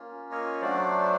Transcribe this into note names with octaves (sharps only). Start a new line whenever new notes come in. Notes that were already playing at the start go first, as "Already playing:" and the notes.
Already playing: A#3 C#4 F4
C#5 D#5
F#3 A3 D4 C5 D5